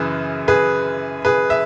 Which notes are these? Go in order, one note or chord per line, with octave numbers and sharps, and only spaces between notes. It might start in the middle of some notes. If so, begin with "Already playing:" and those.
Already playing: F#2 C#3 E3 G#4 B4
G#4 B4
G#4 B4
E5